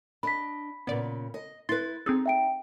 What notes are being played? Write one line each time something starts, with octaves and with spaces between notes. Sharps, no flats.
D4 D#5 B5 B6
A#2 C#3 B3 D5
D#5
E4 B4 C6 A6
C4 D#4 G#4 A4
E5 G5 D7